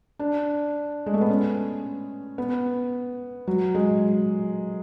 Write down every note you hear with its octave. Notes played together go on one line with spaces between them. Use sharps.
D4
G#3
A3
B3
C#4
B3
F#3
G#3